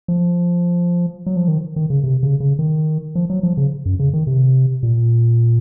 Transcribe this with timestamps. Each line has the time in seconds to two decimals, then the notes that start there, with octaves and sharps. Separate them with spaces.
0.08 F3
1.26 F#3
1.36 F3
1.48 D#3
1.76 D#3
1.90 C#3
2.04 C3
2.23 C#3
2.40 C#3
2.59 D#3
3.15 F3
3.30 F#3
3.43 F3
3.57 C#3
3.86 F#2
4.00 C#3
4.14 D#3
4.27 C3
4.83 A#2